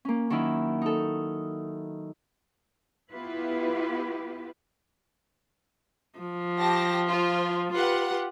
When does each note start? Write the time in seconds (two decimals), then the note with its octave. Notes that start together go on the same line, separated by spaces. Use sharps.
0.05 A#3 C#4
0.30 D#3 F#3 C#4 D4 E4
0.82 D#4 A4
3.11 B3 E4 F4 G4 B4
6.19 F3
6.58 G4 A5 A#6
7.09 F4 C5
7.72 F4 G4 B4 F#5